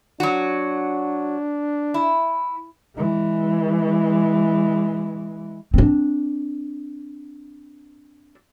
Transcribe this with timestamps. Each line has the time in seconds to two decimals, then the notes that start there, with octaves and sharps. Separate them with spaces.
0.20 F#3 D4 F#4
1.94 E4
2.96 E3 G#3
5.74 C4 D4